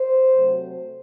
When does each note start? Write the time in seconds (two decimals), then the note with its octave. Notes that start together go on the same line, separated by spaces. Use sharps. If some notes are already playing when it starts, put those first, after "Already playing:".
Already playing: C5
0.33 C3 F#3 A3